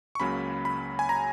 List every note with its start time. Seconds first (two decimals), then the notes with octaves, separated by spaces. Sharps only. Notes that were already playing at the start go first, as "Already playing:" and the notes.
0.15 C#6
0.20 C#2 C#3 F#3 A#3 C#4 B5
0.65 B5
0.99 G#5
1.09 A#5